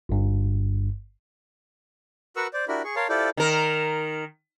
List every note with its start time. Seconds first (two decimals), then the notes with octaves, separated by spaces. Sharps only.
0.09 G1 G2
2.36 F#4 A#4 B4 F#5 C#6 E6
2.53 C5 D5
2.68 D4 E4 F#4 G4 A#4 B5
2.84 G#4 C#6
2.96 A#4 C#5 F5 A5 C6
3.09 E4 F4 G4 A4 C5 D5
3.37 D#3 A#4